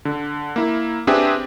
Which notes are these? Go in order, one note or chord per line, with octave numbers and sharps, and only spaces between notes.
D3
A#3 E4
C4 D4 G4 G#4 B4 E5